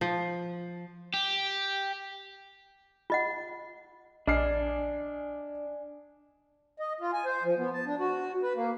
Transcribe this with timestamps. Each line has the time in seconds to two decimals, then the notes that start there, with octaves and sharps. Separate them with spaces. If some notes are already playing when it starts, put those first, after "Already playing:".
0.01 F3
1.14 G4
3.10 F4 D#5 F#5
4.27 A#1 D4 D5 D#5 G#5 F6 C7
6.80 D#5
7.01 F4
7.13 G#5
7.26 C5
7.43 F3
7.58 B3
7.73 A5
7.86 D4
8.00 F#4
8.43 B4
8.56 A#3